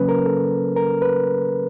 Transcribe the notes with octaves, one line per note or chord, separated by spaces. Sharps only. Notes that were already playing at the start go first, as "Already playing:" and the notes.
Already playing: C#3 F#3 A#3 C#4 B4
A#4
A4
A#4
B4